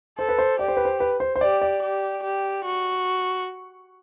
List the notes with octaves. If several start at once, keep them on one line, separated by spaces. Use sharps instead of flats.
A4 C5
B4
C5
G4 D5
C5
B4
C5
B4
C5
C5
G4 D5
D5
G4
G4
F#4